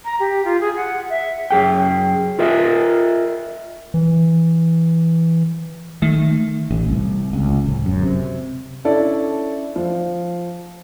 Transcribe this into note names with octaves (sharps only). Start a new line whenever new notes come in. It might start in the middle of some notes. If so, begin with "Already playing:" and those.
A#5
G4
F4
G#4
F#5
E5
F#2 G#4 G5
F4 A#4 D#5 E5
E3
D#3 A3
A1
C2
C#2
D1
F#2
C3
C#4 D4 E4 A4 D5
F3